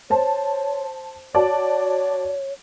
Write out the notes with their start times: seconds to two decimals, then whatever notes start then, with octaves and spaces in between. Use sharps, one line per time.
0.10 C5 C#5 A5
1.34 F#4 C#5 D5 A5